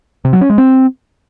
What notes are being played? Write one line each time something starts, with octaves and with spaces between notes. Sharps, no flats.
C3
F#3
C#4
G#3
C4